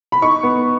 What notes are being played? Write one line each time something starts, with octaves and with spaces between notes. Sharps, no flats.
B5
D#4 C#6
B3